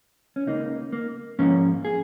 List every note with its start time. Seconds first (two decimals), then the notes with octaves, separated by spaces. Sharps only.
0.36 C#4
0.47 C#2 C#3 A#3 D#4
0.92 A#3
1.39 G#2 F3 A#3 C#4
1.85 G#4